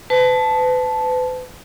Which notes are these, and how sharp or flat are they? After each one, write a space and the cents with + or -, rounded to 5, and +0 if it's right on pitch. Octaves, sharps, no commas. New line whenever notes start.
B4 +35 A5 -10